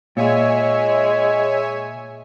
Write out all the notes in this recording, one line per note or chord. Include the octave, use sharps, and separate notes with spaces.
A#2 G#3 C#5 E5 G#5